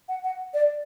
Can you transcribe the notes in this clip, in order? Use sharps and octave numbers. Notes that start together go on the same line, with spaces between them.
F#5
F#5
D5